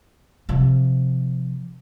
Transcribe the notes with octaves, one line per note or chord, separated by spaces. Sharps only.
C3 F3